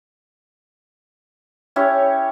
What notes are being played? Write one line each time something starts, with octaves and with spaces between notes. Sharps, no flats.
C#4 E4 G4 C#5